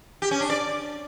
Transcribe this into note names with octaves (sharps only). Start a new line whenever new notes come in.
G4
C#4
D4
D5